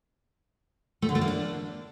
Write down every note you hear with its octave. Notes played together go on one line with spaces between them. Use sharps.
A3
D3
A3
A#3
D4